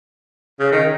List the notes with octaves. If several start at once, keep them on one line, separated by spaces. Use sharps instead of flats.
C#3
D#3